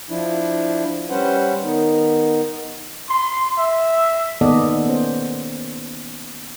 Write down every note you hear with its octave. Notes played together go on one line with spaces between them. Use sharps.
F3 D4 E4
G3 C#4 B4 C5 F#5
D#3 B3 D#4
C6
E5
D#3 A#3 B3 A4 D5 D#5
B3 C#4 C5